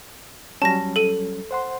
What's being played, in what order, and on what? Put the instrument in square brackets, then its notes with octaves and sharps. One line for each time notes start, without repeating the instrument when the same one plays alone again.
[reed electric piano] F#3 G3 C#4 [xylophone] A5 A#6
[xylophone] A4 D#7
[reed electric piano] C5 F#5 C6